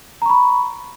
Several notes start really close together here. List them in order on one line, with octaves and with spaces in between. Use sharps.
A#5 C#6 B5